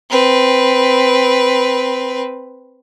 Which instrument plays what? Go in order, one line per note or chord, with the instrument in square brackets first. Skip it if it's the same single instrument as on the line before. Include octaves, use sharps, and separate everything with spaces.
[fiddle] C4 B4